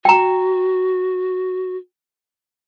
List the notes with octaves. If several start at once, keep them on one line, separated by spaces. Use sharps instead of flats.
F#4 G5 A#5